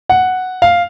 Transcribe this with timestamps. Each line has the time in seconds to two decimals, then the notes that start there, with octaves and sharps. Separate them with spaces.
0.09 F#5
0.62 F5